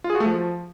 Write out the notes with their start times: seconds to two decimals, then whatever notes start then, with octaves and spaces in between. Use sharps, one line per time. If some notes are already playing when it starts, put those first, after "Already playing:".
0.04 F4
0.10 G#4
0.15 F#4
0.20 A3
0.26 F3